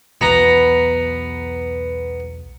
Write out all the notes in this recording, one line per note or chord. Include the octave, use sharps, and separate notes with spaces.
B1 E2 B2 B3 A#5